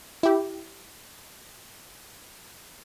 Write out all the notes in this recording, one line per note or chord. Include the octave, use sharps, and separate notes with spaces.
E4 G4